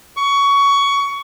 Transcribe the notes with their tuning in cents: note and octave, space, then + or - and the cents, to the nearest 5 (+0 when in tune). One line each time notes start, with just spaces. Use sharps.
C#6 +20